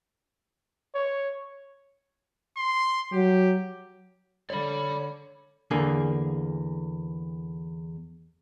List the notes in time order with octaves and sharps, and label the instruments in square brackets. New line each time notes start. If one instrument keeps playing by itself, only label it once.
[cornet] C#5
[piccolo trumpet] C6
[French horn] F#3 [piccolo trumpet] G4
[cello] D3 [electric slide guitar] C#5 [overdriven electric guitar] D5 B5
[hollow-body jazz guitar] E2 D3 A#3 G#4